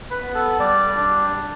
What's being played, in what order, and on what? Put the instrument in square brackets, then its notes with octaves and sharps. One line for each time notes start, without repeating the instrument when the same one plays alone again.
[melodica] B4
B3
A4
G3 D5
D4
G3